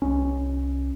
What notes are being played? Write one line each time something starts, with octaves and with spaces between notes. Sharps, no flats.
C2 C#4